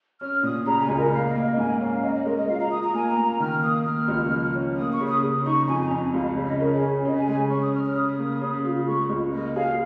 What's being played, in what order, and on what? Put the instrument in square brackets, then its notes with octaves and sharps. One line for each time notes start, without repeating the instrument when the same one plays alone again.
[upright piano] C#4 [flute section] F6
[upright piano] A#2 [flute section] D#6
[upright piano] C#3 [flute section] A#5
[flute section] G#5
[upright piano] C#2
[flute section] A#4
[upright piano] A#3 [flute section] F5
[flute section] D#5
[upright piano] A#3
[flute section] D#5
[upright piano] G#2 [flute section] G#5
[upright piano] C#4 [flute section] F5
[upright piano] C#4 [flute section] D#5
[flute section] D#5
[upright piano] G#3 [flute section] A#4
[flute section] D#5
[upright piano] F4 [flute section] F5
[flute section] A#5
[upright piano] F4 [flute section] D#6
[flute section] A#5
[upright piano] A#3 [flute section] G#5
[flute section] A#5
[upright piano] A#3
[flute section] A#5
[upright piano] D#3 [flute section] F6
[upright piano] A#3 [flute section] D#6
[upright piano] A#3 [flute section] F6
[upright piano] C#2
F3
C#4
[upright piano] A#3 [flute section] D#6
[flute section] C#6
[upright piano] C#3
[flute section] D#6
[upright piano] C#3
[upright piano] D#4 [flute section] C#6
[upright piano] F2 [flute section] G#5
[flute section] A#5
[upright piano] F2
[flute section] G#5
[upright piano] C#2 [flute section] F5
[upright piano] C#3
[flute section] D#5
[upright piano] C#4 [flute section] A#4
[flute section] G#4
[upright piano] C#4
[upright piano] C#3 [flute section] D#5
[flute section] G#5
[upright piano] G#3 [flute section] G#5
[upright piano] C#4 [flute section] C#6
[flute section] D#6
[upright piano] C#4 [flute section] F6
[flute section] F6
[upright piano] C#3 [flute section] D#6
[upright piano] A#3
C#3
F4
[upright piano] G#3 [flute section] C#6
[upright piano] C#2
[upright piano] A#3 [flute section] D#5
[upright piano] G#4 [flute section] F5